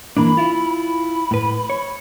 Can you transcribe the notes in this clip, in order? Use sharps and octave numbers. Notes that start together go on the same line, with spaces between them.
E3 A#3 D4 B5
E4 F4
B5
A2 B4
C#5